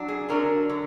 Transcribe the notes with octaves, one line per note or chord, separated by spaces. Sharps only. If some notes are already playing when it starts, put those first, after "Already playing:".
Already playing: F#3 D4
G#4
D3 F#3 D4 A#4
D3